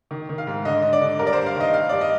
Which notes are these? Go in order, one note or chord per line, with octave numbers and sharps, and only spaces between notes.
D#3
D#3
F5
G#2
D3 D#5
D3 D#5
D5
D3
G2 A#4
D5
G2 C5
F5
D#3 D#5
G2 F5
G2 D5
D#5